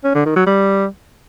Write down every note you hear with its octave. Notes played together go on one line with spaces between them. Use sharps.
C#4
D3
D#3
F#3
G3